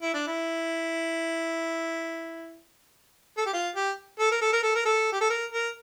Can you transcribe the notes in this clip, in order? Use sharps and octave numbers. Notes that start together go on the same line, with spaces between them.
E4
D4
E4
A4
G4
F4
G4
A4
A#4
A4
A#4
A4
A#4
A4
G4
A4
A#4
A#4